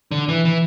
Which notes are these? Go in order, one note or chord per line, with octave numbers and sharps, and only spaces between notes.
D3
E3
E3